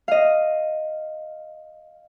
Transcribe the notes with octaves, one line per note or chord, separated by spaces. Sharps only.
D#5 F5